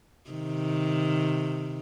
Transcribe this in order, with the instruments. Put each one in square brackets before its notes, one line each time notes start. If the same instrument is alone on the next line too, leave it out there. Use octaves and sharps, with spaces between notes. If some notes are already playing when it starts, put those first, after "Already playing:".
[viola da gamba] C3 D#3